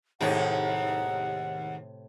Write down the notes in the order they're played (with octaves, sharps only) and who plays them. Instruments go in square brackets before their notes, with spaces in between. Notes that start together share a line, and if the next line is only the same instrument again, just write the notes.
[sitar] D#2 G#3 D#4 [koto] A2 C3 G5 [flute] F#5